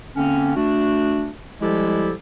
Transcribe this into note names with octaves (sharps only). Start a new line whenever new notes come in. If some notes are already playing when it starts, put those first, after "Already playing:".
D3 A#3 C4 C#4
A3 D4 F#4
F3 G3 G#3 E4 G4 A4